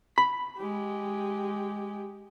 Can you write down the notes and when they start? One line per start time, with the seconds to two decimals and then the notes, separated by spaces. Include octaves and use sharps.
0.18 B5
0.57 G#3 G4